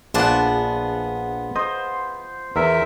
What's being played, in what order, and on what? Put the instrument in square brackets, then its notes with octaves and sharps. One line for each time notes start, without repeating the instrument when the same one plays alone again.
[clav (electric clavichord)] A#1 D4 D5 [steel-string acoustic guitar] B3 G#4 A5 [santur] F4 F#5
[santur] C5 [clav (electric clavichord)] D#5
[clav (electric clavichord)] E2 [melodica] A#4 E5